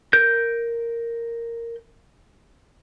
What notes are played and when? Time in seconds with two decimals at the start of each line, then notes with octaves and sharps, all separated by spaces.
0.13 A#4 G6